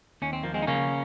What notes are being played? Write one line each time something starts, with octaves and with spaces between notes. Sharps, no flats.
D#2 C#4
C4
F3 A#3
G#3 C4
D#4
C#3 A#3 C#4